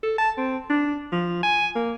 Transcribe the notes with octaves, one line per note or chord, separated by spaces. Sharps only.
A4
A5
C4
D4
F3
G#5
A#3